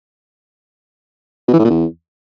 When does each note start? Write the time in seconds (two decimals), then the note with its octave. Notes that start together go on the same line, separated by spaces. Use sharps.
1.48 B2
1.53 E3
1.59 A2
1.65 A#2
1.70 E2